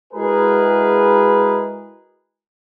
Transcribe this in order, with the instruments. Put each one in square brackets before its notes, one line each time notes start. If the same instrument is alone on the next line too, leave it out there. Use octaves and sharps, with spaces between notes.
[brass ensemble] G#3 E4 F#4 G#4 A#4 B4